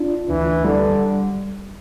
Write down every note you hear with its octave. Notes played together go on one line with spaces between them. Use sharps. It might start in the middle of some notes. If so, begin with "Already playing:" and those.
Already playing: D4 F4
D2 E3
D3 G3